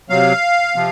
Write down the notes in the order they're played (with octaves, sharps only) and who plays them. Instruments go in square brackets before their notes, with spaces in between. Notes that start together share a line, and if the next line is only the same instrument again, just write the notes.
[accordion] C3 F#3 F5
C3 F3